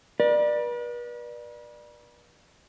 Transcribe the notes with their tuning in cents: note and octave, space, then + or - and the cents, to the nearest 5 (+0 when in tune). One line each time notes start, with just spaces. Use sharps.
B4 -40 D5 +20